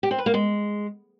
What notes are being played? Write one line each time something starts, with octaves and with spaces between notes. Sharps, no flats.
G4
C4
B4
A#3
G#3